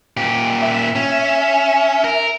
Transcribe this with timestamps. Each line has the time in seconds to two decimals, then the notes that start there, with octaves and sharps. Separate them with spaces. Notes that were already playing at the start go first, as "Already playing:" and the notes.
0.17 A#2 G4
0.59 E5
0.96 C#4
2.04 A#4